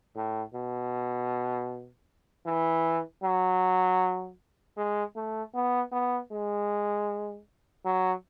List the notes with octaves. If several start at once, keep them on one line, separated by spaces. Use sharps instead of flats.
A2
B2
E3
F#3
G#3
A3
B3
B3
G#3
F#3